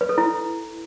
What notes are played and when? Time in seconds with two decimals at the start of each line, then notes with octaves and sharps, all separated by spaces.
0.01 B4
0.09 A4
0.18 E4